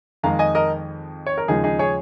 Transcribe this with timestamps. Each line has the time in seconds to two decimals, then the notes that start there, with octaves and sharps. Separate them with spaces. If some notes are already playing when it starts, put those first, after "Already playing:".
0.23 F2 D#3 G#3 F5 A#5
0.39 D#5 G#5
0.55 A#4 D#5
1.26 C#5
1.38 A#4
1.48 D#2 C#3 F3 G#3 D#4 G#4
1.64 D#4 G#4
1.79 G#4 C#5